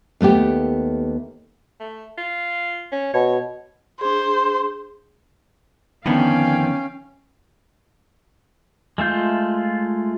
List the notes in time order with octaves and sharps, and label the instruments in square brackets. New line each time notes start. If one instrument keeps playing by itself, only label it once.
[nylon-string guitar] D#2 A3 B3 G4
[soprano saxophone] A3
F4
C#4
[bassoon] B2 [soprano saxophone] C#5
[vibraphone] D4 G#4 [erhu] C5
[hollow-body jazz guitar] F2 D3 B3 [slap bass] D#3 [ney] C#4 [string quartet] F5 G5 G#5
[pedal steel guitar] G#3 A3 F4 G6